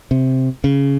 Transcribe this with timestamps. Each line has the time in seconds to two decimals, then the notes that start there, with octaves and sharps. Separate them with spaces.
0.11 C3
0.64 C#3